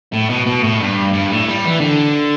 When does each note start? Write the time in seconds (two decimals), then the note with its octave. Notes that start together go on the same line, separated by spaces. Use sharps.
0.13 A2
0.29 B2
0.46 B2
0.64 A2
0.80 G2
1.13 G2
1.31 A2
1.48 G3
1.65 E3
1.80 D3